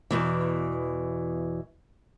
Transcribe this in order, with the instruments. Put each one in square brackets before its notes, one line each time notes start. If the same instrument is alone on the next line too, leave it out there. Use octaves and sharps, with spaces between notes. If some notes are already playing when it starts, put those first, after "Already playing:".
[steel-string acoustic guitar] E2 B2 E3